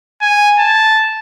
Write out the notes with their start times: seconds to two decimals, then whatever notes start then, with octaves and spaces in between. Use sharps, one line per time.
0.22 G#5
0.59 A5